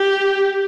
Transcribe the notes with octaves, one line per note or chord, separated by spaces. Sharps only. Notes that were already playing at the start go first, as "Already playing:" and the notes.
Already playing: G4